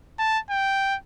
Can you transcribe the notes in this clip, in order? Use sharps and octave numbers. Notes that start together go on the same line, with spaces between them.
A5
G5